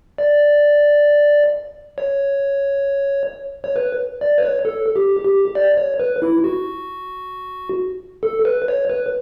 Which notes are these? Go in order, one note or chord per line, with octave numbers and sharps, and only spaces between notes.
D5
C#5
C#5
B4
D5
B4
C#5
A4
G4
G4
D5
C#5
B4
E4
F#4
A4
B4
C#5
B4